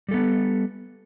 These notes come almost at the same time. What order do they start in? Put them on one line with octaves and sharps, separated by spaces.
G3 A4 B3